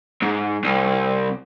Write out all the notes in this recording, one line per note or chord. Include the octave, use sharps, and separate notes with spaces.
G#2
C2